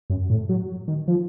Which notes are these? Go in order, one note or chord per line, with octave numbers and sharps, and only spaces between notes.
F#2
A2
F#3
D#3
F3